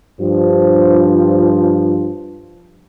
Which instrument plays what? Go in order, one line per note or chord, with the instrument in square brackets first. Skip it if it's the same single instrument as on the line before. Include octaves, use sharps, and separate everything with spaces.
[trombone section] G2 F3